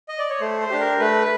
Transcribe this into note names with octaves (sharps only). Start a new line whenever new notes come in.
D#5
D5
C#5
A3 C5
C5
D4 G4
A#4
A3 B4